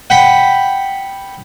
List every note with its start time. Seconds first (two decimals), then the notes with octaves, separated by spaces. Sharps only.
0.10 F#5 G5 B5